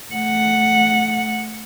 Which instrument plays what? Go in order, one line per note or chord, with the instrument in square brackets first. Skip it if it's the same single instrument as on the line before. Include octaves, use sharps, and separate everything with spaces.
[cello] A3 F#5